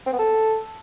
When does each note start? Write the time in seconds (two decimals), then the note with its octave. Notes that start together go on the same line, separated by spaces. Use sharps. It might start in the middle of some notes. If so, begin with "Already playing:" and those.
0.06 C4
0.13 B3
0.19 A4